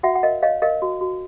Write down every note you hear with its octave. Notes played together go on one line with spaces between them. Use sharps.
F#4 E5 F#5
F#5
A#4 D#5 F5
C#5 D#5 F5
A#4 D#5 F5
F#4
F#4